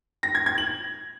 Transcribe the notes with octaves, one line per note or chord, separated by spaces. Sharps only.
A#6
G#6
G#6
F#7